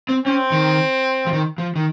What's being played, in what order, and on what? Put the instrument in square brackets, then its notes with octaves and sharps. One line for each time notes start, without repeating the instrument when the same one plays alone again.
[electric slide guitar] C4
[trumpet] C4 [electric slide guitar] C#4
[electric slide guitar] D#3
F3
D#3
F3
D#3